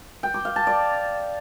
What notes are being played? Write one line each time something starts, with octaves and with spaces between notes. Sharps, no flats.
G5
D6
F5
A5
D5